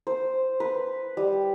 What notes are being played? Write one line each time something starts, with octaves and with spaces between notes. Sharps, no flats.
C5
B4
G3